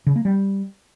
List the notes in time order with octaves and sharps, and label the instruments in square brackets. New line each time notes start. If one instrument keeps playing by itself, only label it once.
[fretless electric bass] C#3
A#3
G3